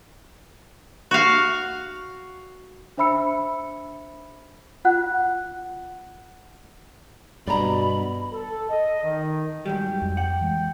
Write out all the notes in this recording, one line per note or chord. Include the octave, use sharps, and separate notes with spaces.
F#4 F5
D4 C5 E5 B5 E6 C#7
F4 F#5 F#6
G2 B2 D5 A#5 B5
A4
D#5
D#3
G#2 F#3 G3 G5
F2
F#5 G5
E3 G#3